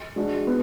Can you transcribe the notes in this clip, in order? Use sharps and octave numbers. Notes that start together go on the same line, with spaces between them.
G#3 D4 F#4
B3